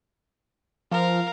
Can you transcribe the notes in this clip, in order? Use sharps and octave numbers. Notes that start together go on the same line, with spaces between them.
F3 A#4 F5